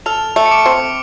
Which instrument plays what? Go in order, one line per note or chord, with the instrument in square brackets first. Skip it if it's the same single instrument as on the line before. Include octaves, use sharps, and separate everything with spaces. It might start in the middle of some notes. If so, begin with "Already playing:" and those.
[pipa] A4 [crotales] F6 F7
[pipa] A3
[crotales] C#7
D6 D7
[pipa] C4